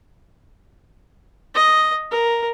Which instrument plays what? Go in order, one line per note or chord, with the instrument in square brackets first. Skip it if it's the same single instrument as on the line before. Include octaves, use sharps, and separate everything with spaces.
[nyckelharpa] D#5
A#4